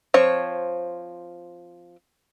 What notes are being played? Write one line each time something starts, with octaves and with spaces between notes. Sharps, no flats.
F3 C4 C#5